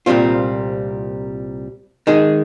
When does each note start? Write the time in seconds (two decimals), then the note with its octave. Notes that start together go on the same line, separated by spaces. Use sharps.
0.06 C2 A#2 G3 C4 F4
2.07 D#3 G#3 D#4 G#4